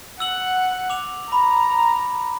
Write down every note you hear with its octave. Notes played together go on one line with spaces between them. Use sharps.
F#5 E6 F#7
D6 F7
A#5 B5